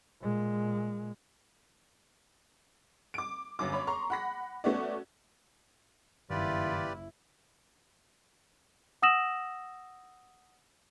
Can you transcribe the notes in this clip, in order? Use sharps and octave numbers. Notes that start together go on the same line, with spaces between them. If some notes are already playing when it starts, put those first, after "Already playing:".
A#2 G#3
D6 D7
G1 F#2 D6
C#5 B5
A#5 C6 C#6
F#5 B5 A#6
A3 B3 C#4 F#4 D5
F#1 G2 D#3 E4 F4 G4 B4 D5
F#5 D#6 E6 A#6 E7 F#7